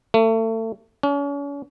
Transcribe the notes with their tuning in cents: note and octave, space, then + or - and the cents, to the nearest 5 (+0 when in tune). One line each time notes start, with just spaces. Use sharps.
A3 +30
C#4 +40